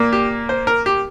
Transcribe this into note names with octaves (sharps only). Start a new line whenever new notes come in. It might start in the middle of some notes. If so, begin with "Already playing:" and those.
Already playing: A#2 A#3
G4
C5
A#4
G4